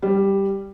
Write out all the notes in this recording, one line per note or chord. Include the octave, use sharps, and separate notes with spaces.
G3